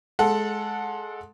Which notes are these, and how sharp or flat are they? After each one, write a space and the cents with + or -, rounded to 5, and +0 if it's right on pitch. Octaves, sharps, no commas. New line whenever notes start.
G#3 +20 A4 +0 F#5 -25